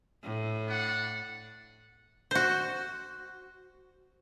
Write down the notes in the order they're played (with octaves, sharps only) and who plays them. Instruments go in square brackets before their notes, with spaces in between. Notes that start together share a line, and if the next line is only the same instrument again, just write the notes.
[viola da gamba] A2
[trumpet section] D4 F#5
[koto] F#4 C5